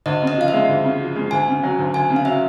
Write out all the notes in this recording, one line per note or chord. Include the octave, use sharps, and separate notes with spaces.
D2 D#5
C#3
D#5
F3 F5
E5
G#3
D2
C#3
F3
G#3
D2 G#5
C#3
F#3
D2
D2 G#5
C#3
F5
F#3 E5